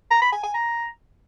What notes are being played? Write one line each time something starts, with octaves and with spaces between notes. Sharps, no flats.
A#5
B5
G#5
G#5
A#5